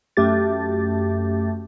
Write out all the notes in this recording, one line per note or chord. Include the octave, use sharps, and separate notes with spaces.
F#2 A3 G4 A6